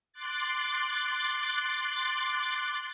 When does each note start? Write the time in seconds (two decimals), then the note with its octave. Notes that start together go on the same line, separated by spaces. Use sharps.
0.13 C6 D6 F#6 A6